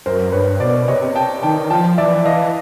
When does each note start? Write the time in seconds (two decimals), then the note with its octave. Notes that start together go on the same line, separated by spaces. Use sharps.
0.06 F#2 A#4 C5
0.32 G2 B4 C#5
0.60 B2 C5 D5
0.88 C3 C#5 D#5
1.15 C3 G5 A5
1.42 D#3 G5 A5
1.70 F3 G5 A5
1.98 E3 D5 E5
2.25 E3 D#5 F5